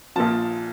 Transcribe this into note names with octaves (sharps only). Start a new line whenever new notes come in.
A#1 A#2 F3 A5